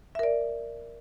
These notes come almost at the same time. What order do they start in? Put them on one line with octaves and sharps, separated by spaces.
E5 A#4 D5